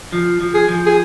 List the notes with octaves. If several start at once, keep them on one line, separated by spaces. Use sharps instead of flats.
F3
F3
G#4
F3
G#4